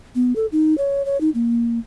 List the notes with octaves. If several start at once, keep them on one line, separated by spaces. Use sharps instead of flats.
B3
A4
D#4
C#5
C#5
D#4
A#3